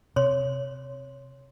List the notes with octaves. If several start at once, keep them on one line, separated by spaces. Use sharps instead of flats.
C3 C#5 C6